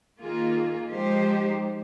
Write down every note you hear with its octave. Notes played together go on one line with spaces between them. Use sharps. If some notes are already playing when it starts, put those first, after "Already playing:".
D#3 A#3 F4 G#4
F3 G#3 D#4 G4 C5